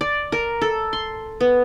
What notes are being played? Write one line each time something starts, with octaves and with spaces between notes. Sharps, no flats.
D5
A#4
A4
C6
B3